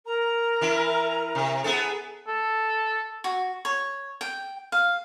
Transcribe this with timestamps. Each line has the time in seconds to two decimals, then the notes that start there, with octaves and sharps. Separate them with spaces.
0.06 A#4 A#5
0.61 E3 E4
1.35 C3
1.64 B3 G#4 A4
2.27 A4
3.24 F#4
3.65 C#5
4.21 G5
4.72 F5